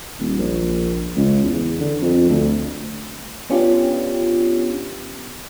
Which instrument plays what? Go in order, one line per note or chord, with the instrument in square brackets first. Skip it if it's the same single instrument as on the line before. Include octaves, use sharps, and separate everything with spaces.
[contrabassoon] D#1
A#1
C#2
E2
D3
F2
D2
[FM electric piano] B3 C#4 D4 F4 G4